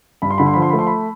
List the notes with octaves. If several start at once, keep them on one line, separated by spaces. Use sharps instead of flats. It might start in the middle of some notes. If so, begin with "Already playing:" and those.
G2 B5
C6
D3 B5
C6
F3 B5
C6
B5
A3
C6
B5